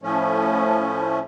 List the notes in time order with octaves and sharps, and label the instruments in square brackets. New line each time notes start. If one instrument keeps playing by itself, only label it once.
[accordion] A2 F3 A3 C#4